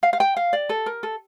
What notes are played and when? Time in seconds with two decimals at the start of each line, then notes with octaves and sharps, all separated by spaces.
0.03 F5
0.13 F5
0.20 G5
0.37 F5
0.53 D5
0.69 A4
0.86 A#4
1.03 A4